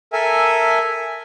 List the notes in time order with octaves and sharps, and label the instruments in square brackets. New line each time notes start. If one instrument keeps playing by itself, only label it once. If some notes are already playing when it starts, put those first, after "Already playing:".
[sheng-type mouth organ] A4 A#4 E5 G#5